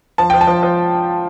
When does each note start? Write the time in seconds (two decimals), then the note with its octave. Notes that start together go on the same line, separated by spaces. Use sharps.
0.18 F3 A5
0.30 F3 G5
0.41 A5
0.47 F3
0.63 F3